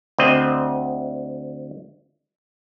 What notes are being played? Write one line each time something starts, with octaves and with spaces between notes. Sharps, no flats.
D2 C4 D#5